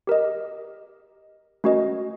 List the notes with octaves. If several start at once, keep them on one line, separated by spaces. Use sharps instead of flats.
G4 A#4 D#5
A3 C#4 F#4 A#4 D#5